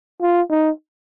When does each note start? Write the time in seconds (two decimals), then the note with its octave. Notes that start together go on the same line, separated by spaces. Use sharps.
0.21 F4
0.50 D#4